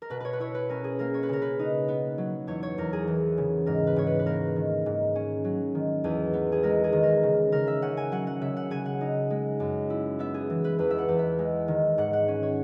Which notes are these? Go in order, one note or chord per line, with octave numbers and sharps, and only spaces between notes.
A#4
B2 B4
B4 C#5
B4
E4 C#5
B4
C#4 A#4
G#4
A#3 A#4
C#5
B4
C#3 A#4
B4
D#4
B3
F#3
E2 C#5
C#5
E2 A#4
G#4
E3
C#3
G#2 A#4
B4
G#2 C#5
B4
B4
A#3 A#4
D#3
G#2
C#4
F#3
D#3
E2 G#4
B3
G#4
G#3 A#4
G#4
D#3
A#4
C#3
C#3 A#4
E5
C#4 F#5
G#5
F#3 F#5
F#5
C#3 E5
F#5
C#3 G#5
F#5
D#4
G#3
F#2
E4
B3 E5
G#4
E3
B4
E2 B4
E5
F#5
E2
E5
G#3
D#3
G#2 F#5
F#5
C#4
C#5